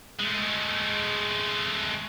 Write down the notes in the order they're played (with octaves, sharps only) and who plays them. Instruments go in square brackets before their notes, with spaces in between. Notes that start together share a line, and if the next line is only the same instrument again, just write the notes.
[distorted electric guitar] G#3 A3